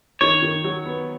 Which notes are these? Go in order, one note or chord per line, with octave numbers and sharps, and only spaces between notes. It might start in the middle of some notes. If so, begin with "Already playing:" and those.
D#3 C#5
D#3
F#3
B3